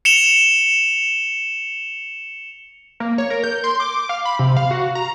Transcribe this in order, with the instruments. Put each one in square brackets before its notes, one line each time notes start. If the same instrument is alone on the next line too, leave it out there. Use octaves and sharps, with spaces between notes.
[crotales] C#7 E7 F7 G7
[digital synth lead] A#3
C#5
A#4
G6
C6
D6
F5
B5
C3
F5
F#4
A#5